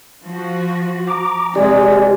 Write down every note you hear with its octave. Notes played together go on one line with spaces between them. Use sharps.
F3 F#4
A#5 D6
C3 G#3 G4 D5